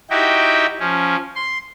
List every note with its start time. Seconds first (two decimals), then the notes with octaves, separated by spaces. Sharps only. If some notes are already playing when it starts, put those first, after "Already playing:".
0.10 D#4 E4 F#4 G4 G5
0.80 F3 C#4
1.36 C6